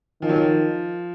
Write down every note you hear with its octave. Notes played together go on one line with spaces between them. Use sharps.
D#3 F3
F#3
F3